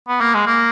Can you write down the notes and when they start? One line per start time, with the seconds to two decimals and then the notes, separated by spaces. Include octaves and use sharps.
0.09 B3
0.21 A#3
0.34 G#3
0.47 A#3